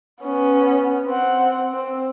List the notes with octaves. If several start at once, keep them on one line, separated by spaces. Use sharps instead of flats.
B3 C#4
C4 F#5
C4